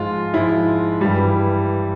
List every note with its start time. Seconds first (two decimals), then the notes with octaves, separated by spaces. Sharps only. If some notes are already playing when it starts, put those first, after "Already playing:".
Already playing: G#2 F3 G#3 F4
0.33 G#2 F3 G#3 E4
1.01 G2 E3 G3